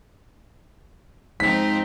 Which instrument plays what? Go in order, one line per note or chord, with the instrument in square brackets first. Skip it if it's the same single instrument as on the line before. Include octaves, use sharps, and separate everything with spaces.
[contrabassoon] G#2 [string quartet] F3 C4 D#4 [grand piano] B6